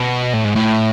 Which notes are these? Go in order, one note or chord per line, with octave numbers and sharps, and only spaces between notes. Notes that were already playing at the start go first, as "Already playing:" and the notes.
Already playing: B2
A2
G#2
A2